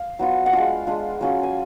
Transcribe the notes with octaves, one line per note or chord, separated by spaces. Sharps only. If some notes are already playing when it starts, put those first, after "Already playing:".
Already playing: F5
F#3 B3 F4
F#5
G#3 D4 F4 F5
G#3 D4 F4
F#3 C#4 F4
G#5